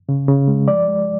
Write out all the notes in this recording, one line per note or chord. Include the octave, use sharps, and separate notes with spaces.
C#3
C#3
G#3
F3 D5
G#3